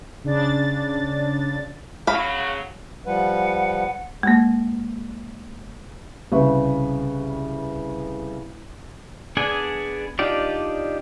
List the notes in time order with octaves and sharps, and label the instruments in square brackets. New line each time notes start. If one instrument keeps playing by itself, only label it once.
[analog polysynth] C#3 D4 A6
[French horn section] C#3 F#3 [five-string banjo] F5 B5
[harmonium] F3 G3 B4 [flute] F#5
[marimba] G#3 A#3
[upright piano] C2 C#3 B4 E5 C#6
[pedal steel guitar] B3 D4 G#4 D5 G#5
D4 D#4 F4 G4 D5